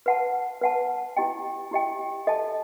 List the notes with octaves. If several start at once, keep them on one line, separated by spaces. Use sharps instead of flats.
B4 F#5 A5
B4 F#5 A5
E4 G4 D#5 G5
E4 G4 D#5 G5
A4 D#5 A5